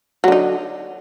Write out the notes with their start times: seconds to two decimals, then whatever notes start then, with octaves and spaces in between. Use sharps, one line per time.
0.24 F#3
0.28 D3
0.32 D#4